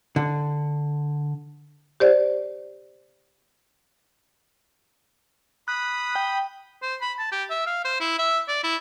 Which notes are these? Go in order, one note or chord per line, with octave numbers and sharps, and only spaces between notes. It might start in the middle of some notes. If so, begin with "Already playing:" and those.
D3
G4 C5 D5
B5 D#6 F#6
G5
C5
B5
A5
G4
E5
F5
C5
E4
E5
D5
E4